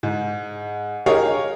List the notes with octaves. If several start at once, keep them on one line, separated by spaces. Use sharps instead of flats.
G#2
G4 G#4 A#4 C#5 D#5 F5